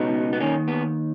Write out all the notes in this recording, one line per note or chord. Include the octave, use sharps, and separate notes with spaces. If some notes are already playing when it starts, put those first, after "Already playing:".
Already playing: C#2 B2 B3 D#4
B3
D#2 D#3 A#3 C#4
B3